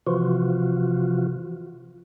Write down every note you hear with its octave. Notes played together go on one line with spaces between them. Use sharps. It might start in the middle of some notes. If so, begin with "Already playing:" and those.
C3 E3 F3 F4 F#4